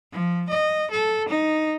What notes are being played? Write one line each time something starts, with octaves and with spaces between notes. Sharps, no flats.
F3
D#5
A4
D#4